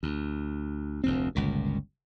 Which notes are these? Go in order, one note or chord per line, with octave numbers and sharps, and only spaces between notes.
D2
F1 D2 C4
G1 C#2 A#2